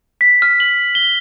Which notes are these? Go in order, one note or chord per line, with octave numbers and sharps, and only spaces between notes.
B6
F6
F#7
G7